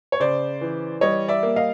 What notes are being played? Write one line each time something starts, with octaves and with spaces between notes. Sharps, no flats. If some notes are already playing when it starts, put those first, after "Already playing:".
C#5
C#3 C5 D5
E3
G3 C#5 D#5
D5 E5
A#3
D#5 F5